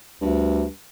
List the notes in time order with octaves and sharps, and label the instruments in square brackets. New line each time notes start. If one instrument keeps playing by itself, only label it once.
[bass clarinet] D2 [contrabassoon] G2